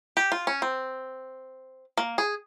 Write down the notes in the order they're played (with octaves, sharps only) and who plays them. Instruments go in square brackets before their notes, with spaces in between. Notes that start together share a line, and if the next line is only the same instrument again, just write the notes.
[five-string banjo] G4
F4
C#4
C4
A#3
G#4